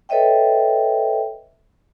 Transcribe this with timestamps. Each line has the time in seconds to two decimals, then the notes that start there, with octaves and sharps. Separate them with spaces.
0.09 A4 B4 C#5 D#5 E5 G5